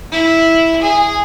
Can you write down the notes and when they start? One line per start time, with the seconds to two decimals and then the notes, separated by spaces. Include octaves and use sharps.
0.12 E4
0.82 G#4